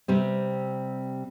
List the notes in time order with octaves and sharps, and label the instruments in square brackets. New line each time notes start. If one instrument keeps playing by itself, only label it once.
[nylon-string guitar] C3 G3 C4